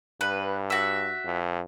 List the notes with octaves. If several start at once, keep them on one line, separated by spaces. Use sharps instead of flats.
G2 B4
F#4 E5
F2